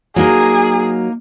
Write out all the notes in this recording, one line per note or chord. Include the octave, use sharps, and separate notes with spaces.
F#3 A#3 D#4 G#4 A#4